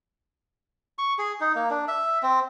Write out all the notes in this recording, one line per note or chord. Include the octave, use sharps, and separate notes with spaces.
C#6
G#4
D#4
A#3
D4
E5
C4